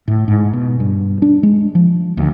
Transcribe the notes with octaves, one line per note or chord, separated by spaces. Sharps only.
A2
G#2
B2
G2
D4
G#3
F3
D2